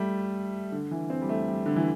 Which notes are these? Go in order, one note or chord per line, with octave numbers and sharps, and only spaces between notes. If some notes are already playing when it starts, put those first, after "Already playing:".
Already playing: G3 A3
D3
E3
C4
G3
A3
G3
D3
E3